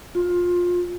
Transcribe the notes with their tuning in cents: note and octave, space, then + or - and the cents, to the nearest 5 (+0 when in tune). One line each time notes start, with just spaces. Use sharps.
F4 +20